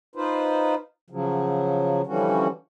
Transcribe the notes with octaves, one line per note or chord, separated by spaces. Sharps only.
D#4 F4 B4 C5
C#3 F3 F#3
D3 E3 F3 G3 C#4 F#4